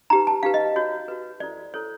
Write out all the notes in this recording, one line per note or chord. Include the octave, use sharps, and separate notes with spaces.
D#4 G4 B4 A#5
A5
D#4 G4 B4 F5
D#5
F#4 B4 C#5
F#4 B4
E4 A4 C5 D5
E4 A4 C5 C#5